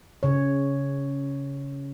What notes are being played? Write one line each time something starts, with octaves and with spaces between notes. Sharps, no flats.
C#3 C#5